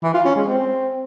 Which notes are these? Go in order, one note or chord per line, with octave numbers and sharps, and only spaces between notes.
E3
F4
C#4
G#3
C4